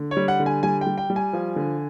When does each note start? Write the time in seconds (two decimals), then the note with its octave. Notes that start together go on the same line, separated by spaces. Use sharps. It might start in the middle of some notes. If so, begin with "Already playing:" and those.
Already playing: D3
0.11 C#5
0.17 G3
0.28 F#5
0.40 D3
0.46 G#5
0.63 G3 G#5
0.81 G5
0.86 G3
0.98 G5
1.10 G3
1.16 G#5
1.33 F3
1.56 D3